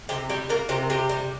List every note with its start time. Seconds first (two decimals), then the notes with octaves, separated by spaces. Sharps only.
0.09 C3 G4
0.29 G3 G4
0.49 A#3 A#4
0.69 C3 G4
0.90 C3 G4
1.09 G3